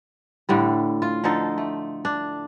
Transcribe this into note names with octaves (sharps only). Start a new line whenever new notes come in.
A2 D3 G3
F4
D3 F3 D#4 A4
A3
D4